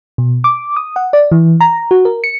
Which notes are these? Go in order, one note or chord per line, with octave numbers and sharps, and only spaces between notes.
B2
D6
D#6
F#5
D5
E3
A#5
F#4
A#4
C#7